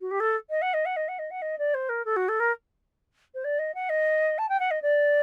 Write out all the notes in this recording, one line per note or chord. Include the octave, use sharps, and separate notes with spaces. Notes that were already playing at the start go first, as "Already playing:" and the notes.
F#4
G4
A4
D#5
F#5
D#5
F#5
D#5
F#5
D#5
F#5
D#5
D5
C5
A#4
A4
F#4
A4
A#4
C5
D5
D#5
F#5
D#5
A5
G5
F#5
D#5
D5